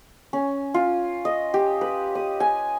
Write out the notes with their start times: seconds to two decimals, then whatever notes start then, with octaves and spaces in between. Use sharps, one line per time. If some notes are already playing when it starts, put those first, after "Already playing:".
0.33 C#4
0.74 F4
1.25 D#5
1.54 G4
1.81 B4
2.15 D#6
2.40 G#5